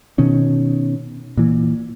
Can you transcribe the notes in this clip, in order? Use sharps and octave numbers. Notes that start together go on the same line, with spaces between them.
B2 D#3 C#4
A#2 E3